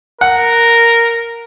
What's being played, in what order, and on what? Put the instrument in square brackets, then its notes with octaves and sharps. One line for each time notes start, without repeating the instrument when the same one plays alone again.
[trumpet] A#4 [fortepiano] F#5